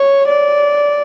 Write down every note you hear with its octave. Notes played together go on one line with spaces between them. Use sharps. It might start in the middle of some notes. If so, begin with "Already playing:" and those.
Already playing: C#5
D5